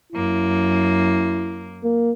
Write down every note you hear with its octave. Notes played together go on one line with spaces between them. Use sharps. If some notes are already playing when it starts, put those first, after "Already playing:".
F#2 A#3 E4
A#3